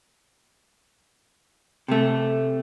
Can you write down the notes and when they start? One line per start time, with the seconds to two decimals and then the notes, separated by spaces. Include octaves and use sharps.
1.88 C3 A3